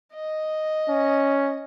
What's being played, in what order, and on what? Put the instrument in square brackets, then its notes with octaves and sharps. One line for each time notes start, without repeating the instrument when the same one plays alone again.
[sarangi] D#5
[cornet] C#4